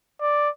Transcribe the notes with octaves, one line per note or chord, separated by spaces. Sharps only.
D5